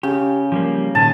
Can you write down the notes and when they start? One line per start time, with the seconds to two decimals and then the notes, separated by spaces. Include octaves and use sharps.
0.03 C#3 G4
0.52 F3 G3 A#3
0.95 A#2 D#3 G#5 A5